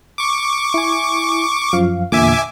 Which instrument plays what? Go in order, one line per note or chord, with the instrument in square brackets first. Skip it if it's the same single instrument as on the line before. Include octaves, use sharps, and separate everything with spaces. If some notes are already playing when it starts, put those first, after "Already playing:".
[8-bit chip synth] C#6 D6
[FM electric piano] E4 G#5
F#2 F3 F5
[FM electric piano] E2 A#2 D3 [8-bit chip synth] E5 G#5 D6